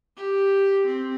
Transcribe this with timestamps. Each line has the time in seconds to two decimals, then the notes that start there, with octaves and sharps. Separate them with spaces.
0.17 G4
0.86 C4